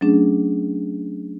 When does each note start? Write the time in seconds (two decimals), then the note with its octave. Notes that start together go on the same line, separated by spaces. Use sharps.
0.01 F#3 A3 C#4 D4 G#4